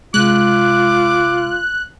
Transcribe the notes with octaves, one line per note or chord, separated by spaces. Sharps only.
C3 G#3 F4 D6 F#6